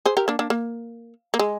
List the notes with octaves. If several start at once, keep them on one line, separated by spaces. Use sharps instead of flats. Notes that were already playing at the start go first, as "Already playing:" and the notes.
G#4 C5
G4 A#4
A#3 D4
A#3 D4
A#3
A#3
G#3